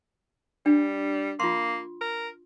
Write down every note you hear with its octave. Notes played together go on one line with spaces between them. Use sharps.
G3 D4
A#3 F4 C6
A#4